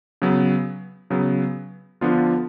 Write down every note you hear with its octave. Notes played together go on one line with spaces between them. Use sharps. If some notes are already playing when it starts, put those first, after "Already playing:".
C#3 F#3 B3
C#3 F#3 B3
D3 F3 B3 D4 F4